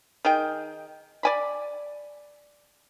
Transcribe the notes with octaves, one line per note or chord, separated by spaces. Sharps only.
D#3 G#4 G5
D5 G#5 B5